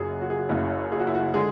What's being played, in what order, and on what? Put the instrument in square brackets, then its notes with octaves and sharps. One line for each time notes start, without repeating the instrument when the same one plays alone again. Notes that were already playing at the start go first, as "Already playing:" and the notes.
Already playing: [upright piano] F#1 F#2 C#3 F#4 G#4
F#4
G#4
F#4
F#1 F#2 C#3 E4
G#4
F#4
E4
F#4
D3 G#3 G#4